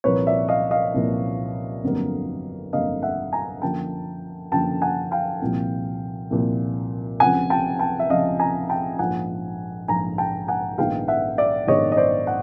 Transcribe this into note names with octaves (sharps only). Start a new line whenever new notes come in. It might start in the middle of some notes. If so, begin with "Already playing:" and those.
C2 A#2 F3 A#3 B4 C#5
D5 E5
D#5 F5
D#5 F5
C2 A#2 F3 A#3
G1 F2 D3 F#3 A#3
G1 F2 D3 F#3 A#3 D#5 F5
E5 F#5
G#5 A#5
F#2 D3 F3 A#3 G5 A5
F#2 D3 F3 A#3 G5 A5
F#5 G#5
F5 G5
C2 A#2 F3
C2 A#2 F3
C#2 C3 F3 F#5 G#5
G5 A5
G5 A5
E5
C#2 C3 F3 D#5 F5
G#5 A#5
G5 A5
A#1 G#2 F3 A#3 F#5 G#5
A#1 G#2 F3 A#3 G#5 A#5
G5 A5
F#5 G#5
A#1 G#2 D#3 G#3 B3 F5 G5
E5 F#5
D5 E5
A#1 G#2 D#3 G#3 B3 C#5 D#5
D#5
C5 D5
F#5